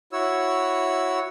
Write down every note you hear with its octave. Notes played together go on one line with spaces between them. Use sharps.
E4 F#4 C#5 E6